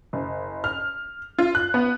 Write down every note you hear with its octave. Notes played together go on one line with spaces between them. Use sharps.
F#1
F6
F4
F#6
B3